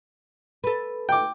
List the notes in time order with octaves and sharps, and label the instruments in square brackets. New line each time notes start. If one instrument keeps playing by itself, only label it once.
[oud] A4 B4
[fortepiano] G5 D6